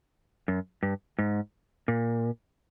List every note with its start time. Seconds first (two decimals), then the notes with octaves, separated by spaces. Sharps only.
0.48 F#2
0.83 G2
1.19 G#2
1.88 A#2